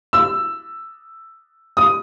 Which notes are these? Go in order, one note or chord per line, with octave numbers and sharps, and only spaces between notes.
E6
D#6